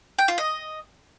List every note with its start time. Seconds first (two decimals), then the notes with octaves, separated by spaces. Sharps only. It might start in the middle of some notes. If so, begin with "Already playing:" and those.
0.19 G5
0.28 F4
0.38 D#5